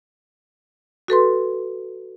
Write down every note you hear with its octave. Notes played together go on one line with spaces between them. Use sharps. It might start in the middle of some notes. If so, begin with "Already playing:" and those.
F#4 A4 B4 C6